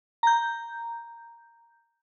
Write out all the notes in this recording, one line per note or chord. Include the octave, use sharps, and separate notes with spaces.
A#5 G6